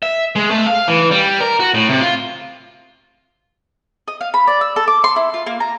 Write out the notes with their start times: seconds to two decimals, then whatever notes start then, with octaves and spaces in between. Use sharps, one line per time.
0.03 E5
0.36 G#3
0.51 A3
0.67 F5
0.88 E3
1.11 G3
1.40 A#4
1.60 F#4
1.74 A2
1.89 C3
2.01 F4
4.08 D#5
4.21 F5
4.34 B5
4.47 D5
4.61 E6
4.76 A4
4.88 D6
5.04 C6
5.16 E4
5.34 F4
5.46 A#3
5.60 A#5